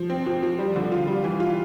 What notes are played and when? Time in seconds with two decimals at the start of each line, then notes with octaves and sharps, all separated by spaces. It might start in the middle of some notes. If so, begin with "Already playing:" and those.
Already playing: F3
0.10 C4
0.26 F3
0.43 F3
0.59 G3
0.76 D3
0.92 F4
1.07 G3
1.24 E3
1.40 F4